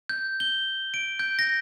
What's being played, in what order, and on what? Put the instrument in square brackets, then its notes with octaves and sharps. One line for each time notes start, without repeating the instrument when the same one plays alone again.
[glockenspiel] G6
G7
D7
G6
A#6